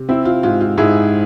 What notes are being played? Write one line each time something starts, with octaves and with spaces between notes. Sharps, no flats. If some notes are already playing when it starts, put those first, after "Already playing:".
Already playing: C3
C4 E4
F4
G#2 F4
F4
G#2 E4 G#4